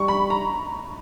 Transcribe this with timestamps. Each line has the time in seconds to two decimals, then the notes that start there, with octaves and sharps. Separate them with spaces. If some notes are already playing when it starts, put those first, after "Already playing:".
Already playing: G3 C#6
0.08 B5
0.30 A#5